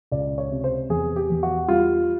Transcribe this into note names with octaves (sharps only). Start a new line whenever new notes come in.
C#2 D5
C#5
C3
C5
E2 G#4
G4
E2
F#4
G3 F4